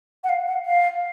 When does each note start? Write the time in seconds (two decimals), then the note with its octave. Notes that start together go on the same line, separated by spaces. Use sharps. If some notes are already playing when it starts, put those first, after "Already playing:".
0.24 F#5
0.29 F5
0.48 F#5
0.66 F5